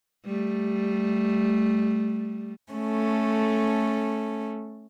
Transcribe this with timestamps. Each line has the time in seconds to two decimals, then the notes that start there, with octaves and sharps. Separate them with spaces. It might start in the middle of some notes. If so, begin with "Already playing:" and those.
0.26 G3 A3
2.72 A3 C#4 A4